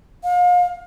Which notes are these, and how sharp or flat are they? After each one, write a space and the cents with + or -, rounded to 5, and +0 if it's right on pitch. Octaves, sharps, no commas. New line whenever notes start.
F5 +35